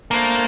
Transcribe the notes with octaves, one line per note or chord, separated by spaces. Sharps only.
A3 A#3 D4 A4 C5